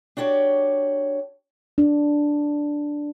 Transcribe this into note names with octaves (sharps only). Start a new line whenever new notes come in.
D4 F#4 G4 C#5 D5
D4